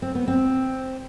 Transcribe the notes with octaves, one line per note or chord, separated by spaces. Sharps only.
C4
B3
C4